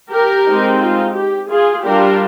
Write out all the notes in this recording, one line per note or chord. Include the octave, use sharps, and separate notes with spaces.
G4 A#4
G#3 C4 D#4
F4
G4
F4 G#4
G3 D4 F4 G4 A#4